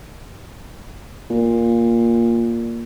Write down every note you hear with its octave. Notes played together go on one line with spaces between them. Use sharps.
A#2